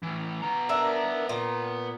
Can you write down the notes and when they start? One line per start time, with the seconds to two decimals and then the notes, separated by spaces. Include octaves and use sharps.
0.03 A2 E3
0.42 B3 A#5
0.69 D4 E4 A#4
1.29 A#2